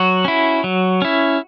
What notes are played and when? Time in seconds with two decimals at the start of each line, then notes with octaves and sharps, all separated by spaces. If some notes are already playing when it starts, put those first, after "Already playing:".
Already playing: F#3 F#4
0.25 C#4 E4
0.64 F#3
1.02 C#4 E4